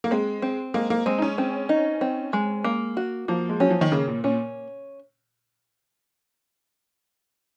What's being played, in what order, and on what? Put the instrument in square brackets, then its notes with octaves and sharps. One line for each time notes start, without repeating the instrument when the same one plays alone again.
[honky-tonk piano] A#3
[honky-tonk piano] G#3 [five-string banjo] C4
[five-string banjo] C4
[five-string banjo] G#3 [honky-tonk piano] A#3
[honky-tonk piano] A#3
[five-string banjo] G#3 [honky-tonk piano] C4
[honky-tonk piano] D#4
C#4
[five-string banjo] C4 [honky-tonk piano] C#4
[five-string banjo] D#4
C4
G#3
A#3
F#4
[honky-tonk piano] F3 [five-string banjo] A#3
[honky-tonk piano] G#3
[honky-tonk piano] F#3 [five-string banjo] C#4
[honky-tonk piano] F3
D#3
[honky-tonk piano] C#3 [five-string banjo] A#3
[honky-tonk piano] A#2
[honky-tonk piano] A#2 [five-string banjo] C#4